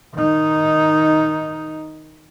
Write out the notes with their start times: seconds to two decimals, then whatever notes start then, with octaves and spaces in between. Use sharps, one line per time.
0.15 D#3 D#4